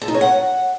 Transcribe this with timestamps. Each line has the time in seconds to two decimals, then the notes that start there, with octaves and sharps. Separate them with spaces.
0.02 A4
0.08 D#4
0.14 C#5
0.21 F#5